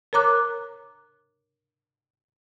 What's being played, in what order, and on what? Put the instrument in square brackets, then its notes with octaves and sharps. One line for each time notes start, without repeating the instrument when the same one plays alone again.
[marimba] A#4 C#5 A#5 D6 F#6